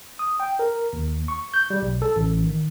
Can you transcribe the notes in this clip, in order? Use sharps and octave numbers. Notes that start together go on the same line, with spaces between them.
D#6
G5
A#4
D#2
C#6
G6
G3
B1
A4
A1
D#3